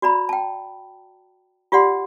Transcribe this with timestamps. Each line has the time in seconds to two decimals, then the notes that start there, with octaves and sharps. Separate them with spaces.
0.02 F#4 D5 A#5 B5
0.29 G5 A5
1.72 F4 G4 D5 F#5 C6